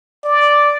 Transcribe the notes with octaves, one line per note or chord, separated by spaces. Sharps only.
D5